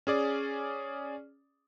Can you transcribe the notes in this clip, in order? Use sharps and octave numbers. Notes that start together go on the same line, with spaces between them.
C#4 G#4 D5